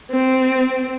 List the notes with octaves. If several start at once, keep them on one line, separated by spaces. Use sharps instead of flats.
C4